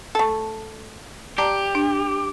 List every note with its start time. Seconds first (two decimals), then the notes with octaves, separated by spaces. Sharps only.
0.15 A3 A4
1.38 G4 D5 A5 A#5
1.75 D4